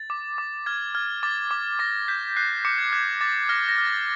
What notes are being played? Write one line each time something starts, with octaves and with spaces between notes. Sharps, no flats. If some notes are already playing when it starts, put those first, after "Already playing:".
Already playing: A6
D6
D6
F6 G#6
F6 G#6
D6 A6
D6
D6 A#6
G6 B6
F#6 C7
D6 C#7
G#6
F#6 G#6
D6 A6
F6 A#6
A#6
F6
A6